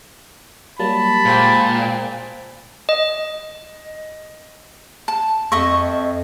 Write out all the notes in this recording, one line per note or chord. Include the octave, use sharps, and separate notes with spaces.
F#3 G3 A#3 A5 B5
A#2 G#3 C5 G5
D#5
A5
F2 D#5 E5 C#6